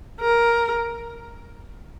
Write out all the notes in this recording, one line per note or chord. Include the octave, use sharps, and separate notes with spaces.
A#4